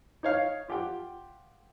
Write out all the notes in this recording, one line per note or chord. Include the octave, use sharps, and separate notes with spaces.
D#4 C#5 F5
F4 G4 F#5 G5